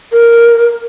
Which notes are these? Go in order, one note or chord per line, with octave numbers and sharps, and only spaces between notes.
A#4